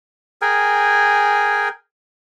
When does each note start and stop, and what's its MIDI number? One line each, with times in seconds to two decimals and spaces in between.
0.42 1.69 68
0.42 1.69 70
0.42 1.69 79
0.42 1.69 80